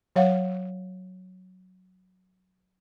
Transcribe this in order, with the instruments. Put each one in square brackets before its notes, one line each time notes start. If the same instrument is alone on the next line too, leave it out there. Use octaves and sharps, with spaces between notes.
[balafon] F#3 C#5 F5 F#5